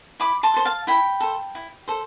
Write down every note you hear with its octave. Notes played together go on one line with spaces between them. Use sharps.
E4 B5 D6
A5 C6
A4 C5
F5 A5
E4 G5 B5
A4 C5
E4
A4 C5